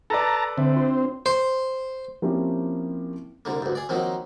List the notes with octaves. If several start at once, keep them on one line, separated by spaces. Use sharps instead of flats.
A4 B4 D5 A5 A#5
D3 C4 E5
D4 F4 C6
C5
F3 A#3 C4 C#4 E4 G4
C2 D3 A#3
D2 G2
G#4 D5
D#3 F3 F#3 A#3 C4